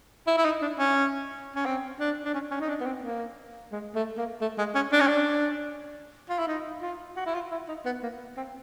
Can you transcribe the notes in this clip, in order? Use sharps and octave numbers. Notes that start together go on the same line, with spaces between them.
E4
E4
D#4
D4
C#4
C#4
C4
D4
D4
C#4
C#4
D#4
D4
B3
C4
A#3
G#3
A3
A#3
A3
G#3
C#4
D4
C#4
D4
F4
E4
D#4
F4
F#4
E4
F4
E4
D#4
B3
A#3
C4